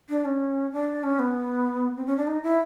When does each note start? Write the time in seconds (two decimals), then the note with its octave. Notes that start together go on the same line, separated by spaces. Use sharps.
0.10 D4
0.25 C#4
0.72 D4
1.03 C#4
1.19 B3
1.97 C4
2.07 C#4
2.17 D4
2.27 D#4
2.43 E4